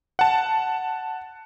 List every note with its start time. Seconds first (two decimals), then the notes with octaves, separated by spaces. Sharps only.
0.19 F#5 A5